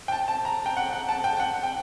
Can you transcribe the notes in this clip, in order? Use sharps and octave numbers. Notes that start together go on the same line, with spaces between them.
G5
A5
A5
A#5
G5
F#5
F#5
A5
G5
F#5
G5